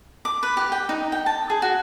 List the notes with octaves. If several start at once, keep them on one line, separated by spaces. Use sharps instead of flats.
D6
B4
G4
G5
D#4
G5
A5
G#4
F#4